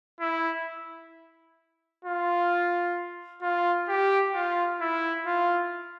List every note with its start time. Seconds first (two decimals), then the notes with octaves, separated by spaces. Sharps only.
0.20 E4
2.04 F4
3.42 F4
3.89 G4
4.34 F4
4.80 E4
5.26 F4